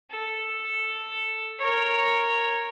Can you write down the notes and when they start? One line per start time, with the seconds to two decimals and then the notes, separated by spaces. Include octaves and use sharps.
0.11 A4
1.59 A#4 C#5